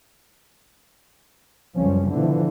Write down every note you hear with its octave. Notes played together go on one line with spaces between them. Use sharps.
C#2 F#2 F3 G3 C#4
B2 D3 E3 F3